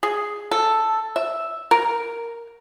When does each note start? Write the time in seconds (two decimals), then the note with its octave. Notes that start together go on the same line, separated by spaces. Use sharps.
0.03 G#4
0.51 A4
1.16 E5
1.71 A#4